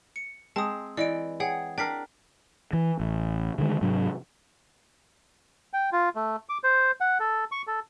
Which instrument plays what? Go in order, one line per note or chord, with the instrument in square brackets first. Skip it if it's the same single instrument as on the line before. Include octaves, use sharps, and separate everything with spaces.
[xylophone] C#7
[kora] G#3 C4 [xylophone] A5 D#6
[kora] E3 [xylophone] D5 D#5 D7
[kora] G#4 [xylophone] C#5 F#5 G5
[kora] D4 A#4 [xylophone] G5 B6 C7
[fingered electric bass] E3
A1
D3 D#3 G#3
G#2 C3 F#3 D4
[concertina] G5
F4
A3
D6
C5
F#5
A4
C#6
A4